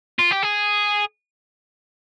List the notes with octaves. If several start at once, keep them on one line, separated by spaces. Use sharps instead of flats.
F4
G4
G#4